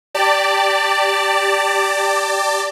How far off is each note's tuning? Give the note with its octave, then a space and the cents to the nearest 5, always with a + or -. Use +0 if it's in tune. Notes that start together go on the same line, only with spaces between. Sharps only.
G4 +5 D5 +0 A5 +30